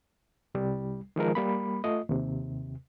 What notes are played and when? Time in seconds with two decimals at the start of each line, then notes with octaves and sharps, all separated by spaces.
0.55 C2 G3
1.16 D#3 F3 G#3 A#4
1.35 G3 A#3 B5
1.84 A3 F4 D#5
2.09 D#2 C3